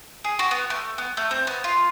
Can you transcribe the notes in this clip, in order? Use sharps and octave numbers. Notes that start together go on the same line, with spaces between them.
G#4
F#4
B3
A3
B3
A3
C4
B3
F4